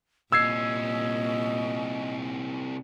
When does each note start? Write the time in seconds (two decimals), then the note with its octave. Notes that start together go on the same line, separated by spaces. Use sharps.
0.32 C2 A#2 C#4 D#5 E6 G#6 C7